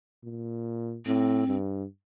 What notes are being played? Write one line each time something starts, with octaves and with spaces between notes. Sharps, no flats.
A#2
A2 C4
G2